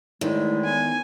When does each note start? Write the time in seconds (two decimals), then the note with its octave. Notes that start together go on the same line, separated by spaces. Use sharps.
0.21 E2 A2 D#3 G#3 A3 E4
0.65 B3 G#5